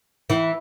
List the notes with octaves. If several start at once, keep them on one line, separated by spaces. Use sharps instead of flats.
E3